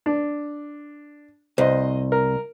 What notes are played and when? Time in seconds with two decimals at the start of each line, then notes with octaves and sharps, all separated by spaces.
0.06 D4
1.58 C2 C5 D#5
2.12 A#4